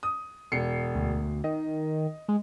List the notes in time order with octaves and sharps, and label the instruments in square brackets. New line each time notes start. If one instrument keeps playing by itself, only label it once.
[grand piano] D#6
E1 C7 C#7
[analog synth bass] D2
[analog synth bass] D#3 [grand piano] D#5
[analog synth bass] G#3